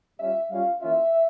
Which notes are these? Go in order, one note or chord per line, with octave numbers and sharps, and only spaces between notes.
G3 C#4 F4 E5
G3 C#4 F4 F5
E3 A#3 C#4 F4 E5